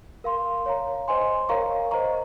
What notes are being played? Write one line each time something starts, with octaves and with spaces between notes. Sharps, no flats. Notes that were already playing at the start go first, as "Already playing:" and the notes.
A#4 F5 C6
C#5 F5 A#5
C5 D#5 G#5 C6
A#4 C#5 F5 A#5 C#6
C5 D#5 A#5 C#6